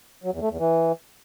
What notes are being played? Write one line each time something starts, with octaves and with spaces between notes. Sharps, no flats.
F#3
E2
A3
E2
E3